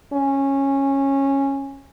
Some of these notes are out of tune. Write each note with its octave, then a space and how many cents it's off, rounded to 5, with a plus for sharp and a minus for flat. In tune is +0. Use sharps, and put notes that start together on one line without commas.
C#4 -15